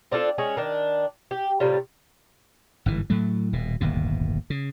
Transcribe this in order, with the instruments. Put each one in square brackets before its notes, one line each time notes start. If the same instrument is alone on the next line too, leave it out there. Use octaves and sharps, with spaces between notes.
[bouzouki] C4 D4 F4 A4
G#3 C#4 G#4
D#3 D4
G4
A2 C3 G3 F4
[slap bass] G1 G#2 E3
A2 F#3 A3
D#1 B2
D1 G1 D#2 B2
C#3